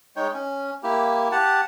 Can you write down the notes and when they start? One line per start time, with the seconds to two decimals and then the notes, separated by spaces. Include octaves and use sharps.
0.16 G#3 D#4 C#5 G5
0.34 C#4
0.83 A#3 E4 G4
1.32 G4 F#5 A5